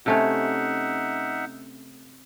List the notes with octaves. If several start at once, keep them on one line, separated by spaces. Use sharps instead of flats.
C3 A3 C#4 D#4 E5 F#5